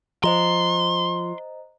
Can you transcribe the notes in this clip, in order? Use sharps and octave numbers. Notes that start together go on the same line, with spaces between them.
F3 C5 D#5 A#5 C6